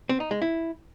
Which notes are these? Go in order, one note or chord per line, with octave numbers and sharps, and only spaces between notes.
C4
D#4
G#3
E4